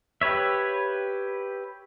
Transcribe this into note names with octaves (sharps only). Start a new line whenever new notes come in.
G4 B4 C#5 E5